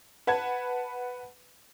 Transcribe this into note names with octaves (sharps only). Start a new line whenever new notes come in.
B4 F#5 A5 G#6